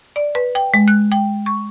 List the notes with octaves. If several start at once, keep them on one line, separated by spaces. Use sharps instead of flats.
D5
B4
G5
G#3
F#6
G5
C#6